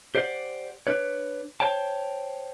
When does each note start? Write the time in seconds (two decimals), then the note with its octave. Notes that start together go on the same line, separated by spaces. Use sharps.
0.15 G4 C5 D5 F5 F#5
0.87 D4 B4 C#5
1.60 C5 C#5 G5 A5